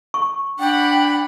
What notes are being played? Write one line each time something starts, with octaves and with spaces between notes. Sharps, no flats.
C#6
D4 F#5 G5 B5